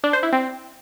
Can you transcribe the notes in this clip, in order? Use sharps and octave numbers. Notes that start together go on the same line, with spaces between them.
D4
C5
E4
C4